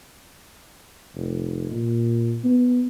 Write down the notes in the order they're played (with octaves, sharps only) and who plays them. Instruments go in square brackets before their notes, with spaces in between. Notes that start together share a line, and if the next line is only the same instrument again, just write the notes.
[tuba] F1
A#2
B3